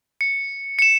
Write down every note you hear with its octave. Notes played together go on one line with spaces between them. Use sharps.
C#7
C#7 E7